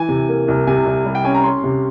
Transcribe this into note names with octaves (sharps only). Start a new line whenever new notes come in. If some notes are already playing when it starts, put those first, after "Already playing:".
Already playing: E3 G#5
C3
A#3
C2
C3 G#5
C2
G3
G5
C#4 G#5
A#5
C#4 C6
C3